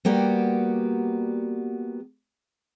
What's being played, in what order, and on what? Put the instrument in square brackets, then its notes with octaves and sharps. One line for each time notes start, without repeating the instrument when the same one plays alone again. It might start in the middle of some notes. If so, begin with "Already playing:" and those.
[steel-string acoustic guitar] G3 A#3 B3 F#4 G4 D5